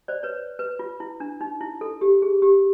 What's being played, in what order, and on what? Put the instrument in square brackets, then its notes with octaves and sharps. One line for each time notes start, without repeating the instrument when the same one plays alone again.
[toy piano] C5 D5
B4 C#5
B4
F4
E4
D4
D#4
E4
A4
G4
G#4
G4